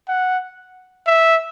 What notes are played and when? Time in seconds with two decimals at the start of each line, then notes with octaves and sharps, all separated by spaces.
0.09 F#5
1.07 E5